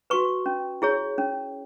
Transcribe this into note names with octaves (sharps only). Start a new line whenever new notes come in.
F#4 B4 C#6
C#4
E4 G#4 C#5
C#4